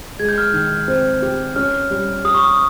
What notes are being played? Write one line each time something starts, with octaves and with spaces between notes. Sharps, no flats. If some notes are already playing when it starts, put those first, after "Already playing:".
G#3 G#6
G6
F6
G6
D#3
C4
G4
C#4 F6
G3
G4 D#6
C#6
D#6